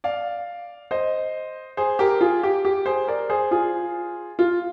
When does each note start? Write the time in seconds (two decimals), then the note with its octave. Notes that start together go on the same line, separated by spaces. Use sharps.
0.04 D5 F5
0.91 C5 D#5
1.77 G#4 C5
1.99 G4 A#4
2.21 F4 G#4
2.43 G4
2.65 G4
2.86 G#4 C5
3.07 A#4 D5
3.30 G#4 C5
3.51 F4 G#4
4.39 F4